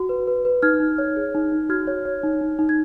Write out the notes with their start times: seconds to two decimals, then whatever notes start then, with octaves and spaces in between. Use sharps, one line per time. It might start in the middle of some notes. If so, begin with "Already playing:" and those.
Already playing: F#4
0.09 B4
0.28 B4
0.45 B4
0.62 D#4 F6 G#6
0.80 D#4
0.98 C#5
1.16 G#4
1.35 D#4
1.52 D#4
1.69 F#4 F6 G#6
1.87 C#5
2.05 C#5
2.23 D#4
2.41 D#4
2.59 D#4
2.69 G#6